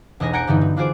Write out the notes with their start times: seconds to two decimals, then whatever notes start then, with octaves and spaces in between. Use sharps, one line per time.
0.20 E1 B1 D#5 G#5 A#6
0.33 F#5 G#5 A#5 G6 C#7 D7
0.47 G2 D3 E3 B3 D#4
0.61 F#3
0.77 D4 F4 F#4 G#4 C5 D6